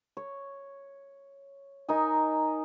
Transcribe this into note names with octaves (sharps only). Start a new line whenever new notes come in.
C#5
D#4 A#4 D#5 G#5